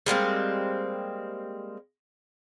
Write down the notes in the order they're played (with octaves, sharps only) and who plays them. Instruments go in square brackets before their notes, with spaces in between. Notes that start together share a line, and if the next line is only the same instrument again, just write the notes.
[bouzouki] G3 G#3 A#3 C4